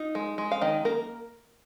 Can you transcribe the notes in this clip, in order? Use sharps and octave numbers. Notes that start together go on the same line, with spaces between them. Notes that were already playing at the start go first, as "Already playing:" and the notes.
Already playing: D#4 F4
G#3
G#3
F5
D#3 D#5
A#3 A#4